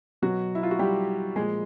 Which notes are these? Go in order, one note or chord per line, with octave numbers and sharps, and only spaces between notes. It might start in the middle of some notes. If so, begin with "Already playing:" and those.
B2 F#3 F#4
E4
F4
F#4
G3 G4
A#2 F3 G#3 G#4